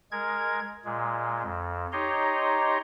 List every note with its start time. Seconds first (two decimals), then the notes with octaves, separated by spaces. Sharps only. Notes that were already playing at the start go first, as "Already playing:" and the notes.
0.12 G#3 A#4 G#6
0.85 A#2 G#3
1.43 F2
1.92 D#4 G4 C#5 D#5 A#5 C6